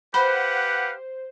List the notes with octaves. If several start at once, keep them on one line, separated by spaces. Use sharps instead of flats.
G4 B4 C5 F5 F#5 B5